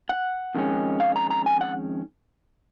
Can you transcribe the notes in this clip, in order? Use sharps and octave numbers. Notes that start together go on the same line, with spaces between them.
F#5
F2 D#3 G#3 C#4
F5
A#5
A#5
G#5
F#5